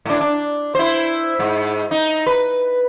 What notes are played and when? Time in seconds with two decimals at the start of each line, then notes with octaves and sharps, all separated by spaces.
0.05 A2 D4
0.21 D4
0.75 E4 C5
1.39 G#2
1.91 D#4
2.27 B4